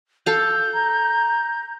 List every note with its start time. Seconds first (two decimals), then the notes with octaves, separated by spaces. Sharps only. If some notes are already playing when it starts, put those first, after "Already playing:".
0.26 A4 F5 G6
0.74 A#5